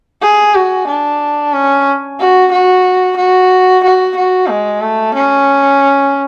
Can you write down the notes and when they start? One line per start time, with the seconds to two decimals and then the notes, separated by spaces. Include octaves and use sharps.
0.22 G#4
0.55 F#4
0.87 D4
1.53 C#4
2.20 F#4
2.52 F#4
3.17 F#4
3.84 F#4
4.16 F#4
4.49 G#3
4.81 A3
5.14 C#4